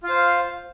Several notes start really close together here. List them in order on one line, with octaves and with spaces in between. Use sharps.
F4 F5 C5